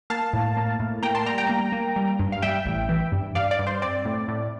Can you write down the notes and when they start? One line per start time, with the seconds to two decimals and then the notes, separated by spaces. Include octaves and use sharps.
0.10 A#3 F5 A5
0.33 A2
0.57 A#3
0.80 A2
1.03 A#3 G5 A#5
1.15 A5 C6
1.26 G3 G5 A#5
1.38 G5 A#5
1.50 A#3
1.72 A#3
1.96 G3
2.19 G2
2.32 F5
2.42 G3 E5 G5
2.66 A1
2.89 E3
3.12 G2
3.35 G2 D5 F5
3.51 D5
3.59 G2
3.67 C5
3.82 C4 D5
4.05 A2
4.28 A2